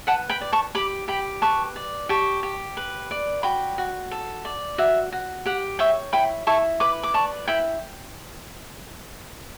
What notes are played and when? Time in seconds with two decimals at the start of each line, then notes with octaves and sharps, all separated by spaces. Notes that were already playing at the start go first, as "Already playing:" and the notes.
0.07 B4 F#5 A5
0.29 G5 B5
0.41 D5
0.53 A5 C#6
0.75 G4 B5 D6
1.08 G4 G5 B5
1.42 B4 A5 C#6
1.76 D5
2.09 G4 A5 C#6
2.43 G4
2.77 B4
3.11 D5
3.43 F#4 G5 B5
3.78 F#4
4.11 A4
4.45 D5
4.78 F#4 E5
5.12 F#4
5.46 G4 F#5
5.79 C#5 E5 G5
6.13 E4 G5 B5
6.47 E4 A5 C#6
6.80 B4 B5 D6
7.03 D6
7.14 D5 A5 C#6
7.48 E4 G5 B5